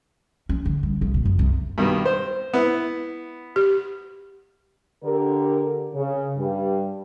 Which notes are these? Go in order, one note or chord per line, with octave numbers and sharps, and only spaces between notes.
C#4
D3
G3
C2
A#2
F#2
C2
G2 B2 D#3
C5
B3 E4
G4
D3 G4 A#4
C#3
G2 G3